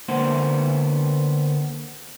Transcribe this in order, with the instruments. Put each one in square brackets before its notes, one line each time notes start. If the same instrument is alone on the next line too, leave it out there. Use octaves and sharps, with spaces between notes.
[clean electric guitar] D3 A#3 B3 C5